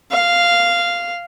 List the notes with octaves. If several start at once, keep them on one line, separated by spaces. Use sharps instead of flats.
F5